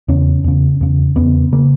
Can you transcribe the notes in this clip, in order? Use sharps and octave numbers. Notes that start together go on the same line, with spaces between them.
E2 C#3 C#4
E2 C#3
E2 C#3
E2 C#3 B3
C#3 A#3